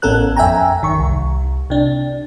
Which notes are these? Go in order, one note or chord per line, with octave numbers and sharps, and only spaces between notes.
A1 B3 C#4 A4 A#4 F#6
F2 E5 G5 G#5 A#5
G#1 D#3 C#6
C2
C3 D4